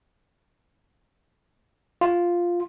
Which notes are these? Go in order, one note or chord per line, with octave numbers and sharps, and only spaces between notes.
F4